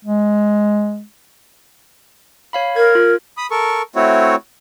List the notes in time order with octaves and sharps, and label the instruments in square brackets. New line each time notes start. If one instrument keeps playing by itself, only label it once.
[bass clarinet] G#3
[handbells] C#5 F5 B5
[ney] A#4 [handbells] G#6
[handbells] F4
[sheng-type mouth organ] B5 D#6
A4 A#4 C#6
A3 C4 E4 F#4 C#5